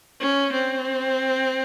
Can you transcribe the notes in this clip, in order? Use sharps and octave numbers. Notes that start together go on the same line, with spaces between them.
C#4
C4